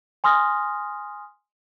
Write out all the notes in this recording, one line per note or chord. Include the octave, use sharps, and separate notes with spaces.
G#5 C6 D#6 F6 A#6